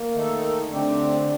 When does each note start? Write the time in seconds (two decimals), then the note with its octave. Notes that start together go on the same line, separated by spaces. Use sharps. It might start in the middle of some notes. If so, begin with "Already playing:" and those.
Already playing: A#3
0.13 D#3 A3 D#4 A4
0.71 D3 A3 C4 D4 G4